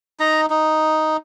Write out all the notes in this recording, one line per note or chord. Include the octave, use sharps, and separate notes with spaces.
D#4 A#5
D#4